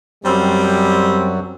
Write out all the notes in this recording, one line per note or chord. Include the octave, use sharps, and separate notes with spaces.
F#2 F#3 G3 C4